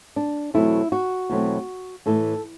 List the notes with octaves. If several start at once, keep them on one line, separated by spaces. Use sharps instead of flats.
D4
E2 B2 F#3 A3 C4 E4
F#4
E2 B2 F#3 A3 C4
A2 E3 A3 A4